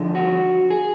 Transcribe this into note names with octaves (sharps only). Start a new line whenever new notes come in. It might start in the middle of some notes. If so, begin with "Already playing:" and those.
Already playing: D3 F3 G#3 D4
F#4
G#4